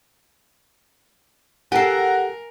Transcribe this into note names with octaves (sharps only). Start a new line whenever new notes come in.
G4 A4 A#4 F#5 G#5 C7